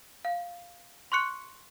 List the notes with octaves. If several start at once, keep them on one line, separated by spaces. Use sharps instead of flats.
F5
C6 C#6 F#6 C#7